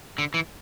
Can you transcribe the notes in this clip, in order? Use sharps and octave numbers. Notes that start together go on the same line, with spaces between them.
D3
E3